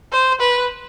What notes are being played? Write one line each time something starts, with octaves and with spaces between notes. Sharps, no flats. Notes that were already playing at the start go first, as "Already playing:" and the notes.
C5
B4